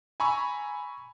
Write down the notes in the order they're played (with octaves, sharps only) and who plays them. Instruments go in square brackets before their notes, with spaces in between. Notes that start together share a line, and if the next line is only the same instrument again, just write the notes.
[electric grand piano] G#5 A#5 B5 C#6 E6